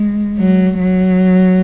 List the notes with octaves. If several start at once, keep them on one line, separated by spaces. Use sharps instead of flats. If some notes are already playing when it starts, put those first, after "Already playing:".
Already playing: G#3
F#3
F#3